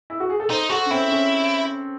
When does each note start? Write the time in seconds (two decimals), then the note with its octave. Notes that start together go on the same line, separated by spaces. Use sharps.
0.10 E4
0.20 F#4
0.30 G#4
0.40 A4
0.49 D#4 C5
0.69 F#4 A4
0.86 C#4
0.91 C4 E4
1.10 C#4